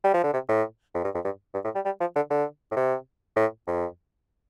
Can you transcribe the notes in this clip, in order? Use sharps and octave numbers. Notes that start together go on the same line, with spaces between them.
G3
F3
D3
C3
A2
F2
G2
F2
G2
G2
A2
G3
G3
F3
D3
D3
A2
C3
A2
F2